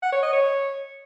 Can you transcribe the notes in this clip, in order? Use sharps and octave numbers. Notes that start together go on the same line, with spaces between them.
F#5
C#5
D#5
C#5